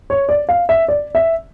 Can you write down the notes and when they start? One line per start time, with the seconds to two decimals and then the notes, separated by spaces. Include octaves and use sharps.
0.10 C#5
0.29 D5
0.49 F5
0.69 E5
0.88 D5
1.15 E5